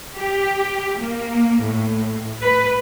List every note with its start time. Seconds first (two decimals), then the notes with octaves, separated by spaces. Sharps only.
0.17 G4
1.00 A#3
1.61 A2
2.41 B4